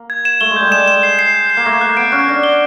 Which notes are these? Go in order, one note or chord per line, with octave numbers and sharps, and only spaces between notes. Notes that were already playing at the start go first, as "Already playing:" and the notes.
Already playing: A#3
G#6
E7
A3 G7
G#3
G3 G6
G#3 E7
E7
C7
C7
G6
C7
A#3
A3 A#6
A#3 F#6
B3 D7
C#4 F#6
D4 A#6
G7